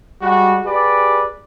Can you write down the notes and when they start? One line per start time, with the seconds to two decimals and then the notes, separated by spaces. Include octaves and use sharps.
0.22 G3 G#3 F#4
0.65 G4 G#4 B4 D5